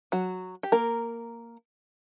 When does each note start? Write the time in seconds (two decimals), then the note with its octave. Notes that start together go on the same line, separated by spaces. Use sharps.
0.12 F#3 F#4
0.63 G4
0.72 A#3 A#4